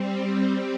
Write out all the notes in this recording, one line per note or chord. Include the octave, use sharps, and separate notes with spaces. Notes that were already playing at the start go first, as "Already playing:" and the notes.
Already playing: G3 C4